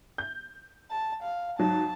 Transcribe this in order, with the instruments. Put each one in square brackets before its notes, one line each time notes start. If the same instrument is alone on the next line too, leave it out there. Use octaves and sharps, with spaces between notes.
[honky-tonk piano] G6
[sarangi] A5
F5
[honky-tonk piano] G#2 F#3 [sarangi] A5